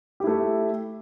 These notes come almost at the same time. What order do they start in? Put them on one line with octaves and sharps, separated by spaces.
G4 E4 A3